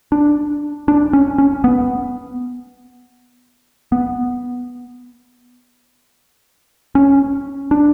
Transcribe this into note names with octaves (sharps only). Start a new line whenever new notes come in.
D4
D4
C#4
C#4
B3
B3
C#4
D4